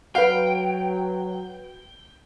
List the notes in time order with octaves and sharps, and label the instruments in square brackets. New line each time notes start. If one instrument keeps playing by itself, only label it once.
[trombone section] F#3 [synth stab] F#4 B4 [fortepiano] F5 [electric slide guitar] G5